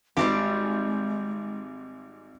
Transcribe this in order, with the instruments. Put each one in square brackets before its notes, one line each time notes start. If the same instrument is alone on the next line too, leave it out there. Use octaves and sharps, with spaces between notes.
[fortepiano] G#1 [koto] G3 C4 G4 [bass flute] G#3